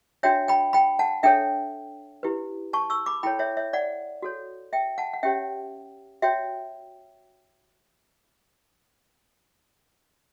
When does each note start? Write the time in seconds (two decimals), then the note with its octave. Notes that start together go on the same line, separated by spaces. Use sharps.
0.23 D4 F#4 C#5 E5 G5
0.48 G5 B5
0.73 G5 B5
0.99 F#5 A5
1.23 D4 A4 C#5 E5 G5
2.23 E4 G4 B4
2.73 A5 C#6
2.90 C#6 E6
3.06 B5 D6
3.23 E4 A4 C#5 G5 B5
3.39 C#5 E5
3.57 C#5 E5
3.73 D5 F#5
4.22 F#4 A4 C#5
4.73 E5 G5
4.98 F#5 A5
5.13 F#5
5.23 C#4 G4 C#5 E5 G5
6.22 F#4 C#5 E5 G5